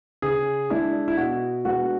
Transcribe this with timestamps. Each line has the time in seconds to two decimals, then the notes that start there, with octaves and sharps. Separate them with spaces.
0.22 C#3 G#4
0.70 G#3 D4 E4
1.08 E4
1.17 B2 F#4
1.65 G#3 B3 D4 F#4